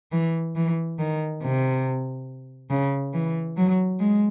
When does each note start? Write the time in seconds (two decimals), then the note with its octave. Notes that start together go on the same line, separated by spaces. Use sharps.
0.12 E3
0.56 E3
0.99 D#3
1.42 C3
2.70 C#3
3.14 E3
3.57 F#3
4.00 G#3